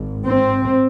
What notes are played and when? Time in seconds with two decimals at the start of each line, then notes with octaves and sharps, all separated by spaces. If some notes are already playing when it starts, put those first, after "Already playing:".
Already playing: G#1 G#2
0.25 C4